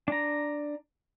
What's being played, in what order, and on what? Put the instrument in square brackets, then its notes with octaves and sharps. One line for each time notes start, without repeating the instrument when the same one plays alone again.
[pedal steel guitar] D4 A#5